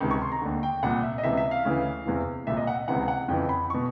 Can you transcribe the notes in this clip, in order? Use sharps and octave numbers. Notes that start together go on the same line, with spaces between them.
C#2 C3 D#3
C#6
C6
A#5
D#2 D3
G5
C2 A#2 F#5
E5
D#5
C#2 C3 E3 E5
E5
F5
D2 C#3 E3
E2 C3 E3
C2 A#2 E5
D#5
F#5
C#2 C3 E3 F#5
F#5
F2 C#3 E3 G5
B5
B2 C#6